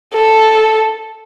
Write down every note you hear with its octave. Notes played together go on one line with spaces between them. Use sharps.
A4